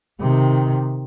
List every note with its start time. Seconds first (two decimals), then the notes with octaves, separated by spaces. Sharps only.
0.20 C3 D#3